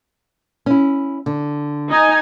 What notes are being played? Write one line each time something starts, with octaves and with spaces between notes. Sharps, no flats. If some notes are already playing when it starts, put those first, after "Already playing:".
C#4 E4
D3
D#4 G#5